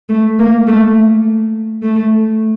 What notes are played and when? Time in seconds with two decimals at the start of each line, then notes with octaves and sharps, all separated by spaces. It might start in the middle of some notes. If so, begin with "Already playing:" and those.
0.09 A3
0.39 A#3
0.67 A3
1.82 A3